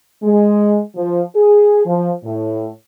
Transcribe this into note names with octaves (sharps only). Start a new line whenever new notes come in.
G#3
F3
G#4
F3
A2